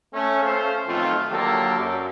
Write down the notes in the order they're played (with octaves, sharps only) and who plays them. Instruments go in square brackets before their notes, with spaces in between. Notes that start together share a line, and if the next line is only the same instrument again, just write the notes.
[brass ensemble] A3 C#4
C#4 A4 C5 F5
B1 F2 D#3 A3 F4
D3 F#3 A#3 G4 A4
F#2